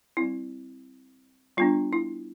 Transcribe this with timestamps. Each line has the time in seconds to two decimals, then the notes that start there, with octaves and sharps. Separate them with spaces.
0.17 G3 C4 E4
1.57 G3 B3 D4 F4
1.93 E4